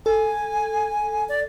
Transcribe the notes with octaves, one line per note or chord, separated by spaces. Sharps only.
A4 G#5
D5